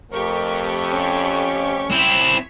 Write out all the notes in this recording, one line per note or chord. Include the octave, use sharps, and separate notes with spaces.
F2 A3 G4 A#4 C#6
C#4
C4 E4 C#5 B6